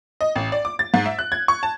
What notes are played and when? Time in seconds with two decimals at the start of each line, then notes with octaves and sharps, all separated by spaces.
0.21 D#5
0.36 A1
0.52 D5
0.65 D6
0.79 A6
0.94 G#2
1.06 E5
1.19 F#6
1.32 G#6
1.48 C#6
1.63 A5